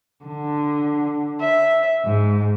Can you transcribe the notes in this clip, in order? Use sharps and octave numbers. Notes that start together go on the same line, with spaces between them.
D3
E5
G#2